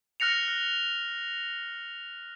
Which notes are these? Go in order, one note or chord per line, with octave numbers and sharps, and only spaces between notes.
F6 F#6 A#6 C#7 F7